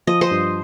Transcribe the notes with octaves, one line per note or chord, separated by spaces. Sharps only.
F3 D#5
C5 D#5
G2